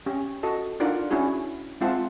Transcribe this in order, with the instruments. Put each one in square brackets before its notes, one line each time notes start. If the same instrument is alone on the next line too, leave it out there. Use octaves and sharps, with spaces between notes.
[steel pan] C#4 G4
F#4 A4 D#5 A5
D4 D#4 F4 A#4 D5 F#5
C#4 D4 E4 F#4 G#4
G#3 C4 F4 E5 F#5 A5